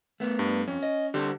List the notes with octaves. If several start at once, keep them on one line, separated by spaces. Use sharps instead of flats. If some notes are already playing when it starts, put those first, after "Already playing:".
A3 B3
G2
F2 C#4
D#5
D3 G3 G4 C5